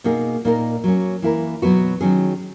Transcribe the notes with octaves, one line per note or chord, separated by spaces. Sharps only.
B2 A#3 D#4 G#4
A#2 A#3 D#4 A#4
F#3 A#3 C#4
E3 A#3 E4 A#4
B2 F#3 B3 F#4
D#3 F#3 C#4 G#4